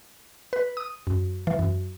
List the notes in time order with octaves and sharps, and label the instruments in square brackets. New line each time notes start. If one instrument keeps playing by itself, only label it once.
[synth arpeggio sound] B4
D#6
F#2
E3
F#2